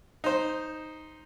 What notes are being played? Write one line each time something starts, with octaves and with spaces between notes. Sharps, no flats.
D#4 C5